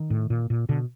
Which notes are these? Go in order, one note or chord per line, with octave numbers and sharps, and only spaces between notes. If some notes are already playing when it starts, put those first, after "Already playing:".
Already playing: D#3
A2
A#2
A#2
B2 D3